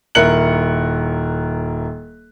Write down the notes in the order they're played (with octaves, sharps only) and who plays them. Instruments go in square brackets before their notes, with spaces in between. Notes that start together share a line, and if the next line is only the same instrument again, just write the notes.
[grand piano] D#1 E4 A#4 F#6 C#7 F#7